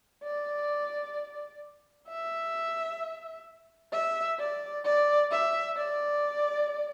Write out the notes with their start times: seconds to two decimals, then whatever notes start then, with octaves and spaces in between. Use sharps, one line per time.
0.23 D5
2.08 E5
3.92 E5
4.39 D5
4.85 D5
5.31 E5
5.77 D5